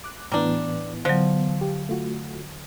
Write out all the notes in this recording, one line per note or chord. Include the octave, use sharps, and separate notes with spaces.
D6 F#6
A2 E3 G3 B3 D4 A#5
D3 F3 F#3
G4
A3 F4 F#4